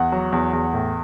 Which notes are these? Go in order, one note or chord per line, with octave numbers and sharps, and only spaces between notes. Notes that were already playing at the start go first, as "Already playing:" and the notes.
Already playing: E2 F#5
F#3
E2
E2
A2